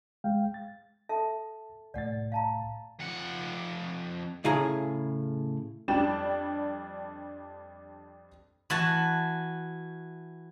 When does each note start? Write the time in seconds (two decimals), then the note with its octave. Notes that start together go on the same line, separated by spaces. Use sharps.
0.24 G#3 F5 G5
0.54 A6
1.09 A4 E5 A5
1.94 C2 A2 D5 F#5 A6
2.32 F5 A5 A#5
3.00 F2 F#5
4.44 A2 C#3 E4 G#4 G#5 A#5
5.88 F2 G3 D4 D5 G5 E7
8.70 E3 F#4 A5